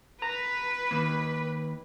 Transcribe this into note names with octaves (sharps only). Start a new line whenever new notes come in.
B4 A#5 B5
D#3 A#3